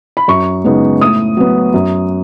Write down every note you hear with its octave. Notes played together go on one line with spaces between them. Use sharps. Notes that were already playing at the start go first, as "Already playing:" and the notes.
B5
F#2 C#6
C#3 G#3 B3 D#4
A2 D#6
F#3 B3
F#2